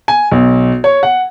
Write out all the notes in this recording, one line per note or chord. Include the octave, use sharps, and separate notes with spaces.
G#5
B1
C#5
F#5